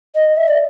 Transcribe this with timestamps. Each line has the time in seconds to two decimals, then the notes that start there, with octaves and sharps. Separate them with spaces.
0.15 D#5
0.37 E5
0.48 D5